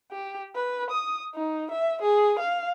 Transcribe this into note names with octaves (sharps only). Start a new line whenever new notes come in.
G4
B4
D#6
D#4
E5
G#4
F5